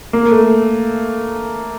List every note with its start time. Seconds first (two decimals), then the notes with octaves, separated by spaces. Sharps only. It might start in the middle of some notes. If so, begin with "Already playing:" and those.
0.13 A#3
0.32 A3